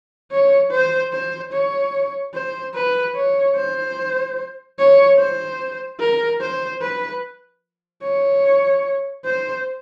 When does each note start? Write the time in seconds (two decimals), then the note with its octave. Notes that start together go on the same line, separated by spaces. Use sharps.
0.32 C#5
0.71 C5
1.13 C5
1.53 C#5
2.34 C5
2.74 B4
3.15 C#5
3.56 C5
4.78 C#5
5.19 C5
6.00 A#4
6.41 C5
6.82 B4
8.02 C#5
9.25 C5